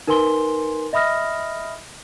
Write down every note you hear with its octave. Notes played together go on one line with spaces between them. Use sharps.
D#4 A#4 B4 G#5 C6 G7
D#5 E5 B5 D#6 F6 A#6